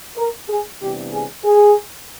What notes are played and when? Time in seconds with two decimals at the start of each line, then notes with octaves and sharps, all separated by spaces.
0.17 A#4
0.49 G#4
0.80 C3 E3 G3 B3 D4 G4
1.13 G#4
1.44 G#4